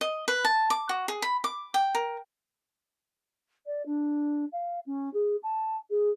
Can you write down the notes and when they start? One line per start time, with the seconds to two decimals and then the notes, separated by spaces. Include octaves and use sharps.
0.01 D#5
0.28 B4
0.45 A5
0.70 D6
0.89 F#4
1.08 G#4
1.22 B5
1.44 D6
1.74 G5
1.95 A#4
3.66 D5
3.85 D4
4.52 F5
4.86 C#4
5.13 G#4
5.42 A5
5.90 G#4